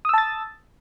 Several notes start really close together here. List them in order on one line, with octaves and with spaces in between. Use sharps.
D#6 E6 A5 A6